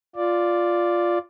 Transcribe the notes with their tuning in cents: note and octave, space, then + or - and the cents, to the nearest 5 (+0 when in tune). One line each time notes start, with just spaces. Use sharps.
F4 +0 D5 +0